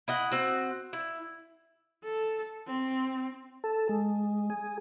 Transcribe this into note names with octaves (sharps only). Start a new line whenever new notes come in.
E4 D#5 F#5
C4 F#4
E4
A4
C4
A4
G#3
G#4